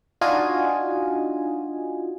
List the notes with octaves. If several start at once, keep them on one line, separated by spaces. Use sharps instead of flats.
D4 D#4 F4 F#4 D#5 G#5